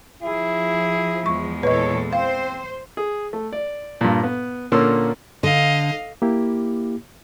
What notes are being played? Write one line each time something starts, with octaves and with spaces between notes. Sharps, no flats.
F3 E4 G#4
E2 G#3 C#6
A#2 E3 A4 B4 C#5 D#5
C4 C5 F5
G#4
A3
D5
G2 A#2
B3
A#2 D3 A#3 C#4 C6 E6
D3 D#5 F5
A#3 E4 G4